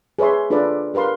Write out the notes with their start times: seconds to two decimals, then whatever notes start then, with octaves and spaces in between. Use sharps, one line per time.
0.19 G#4 B4 C#5 E5 C6
0.50 D4 F4 A4 B4 D5
0.94 G4 A#4 B4 F5 C6